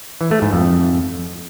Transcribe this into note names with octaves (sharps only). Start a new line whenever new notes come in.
E3
A3
G#2
F2